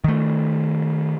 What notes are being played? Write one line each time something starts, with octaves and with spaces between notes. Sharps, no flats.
D#3 A3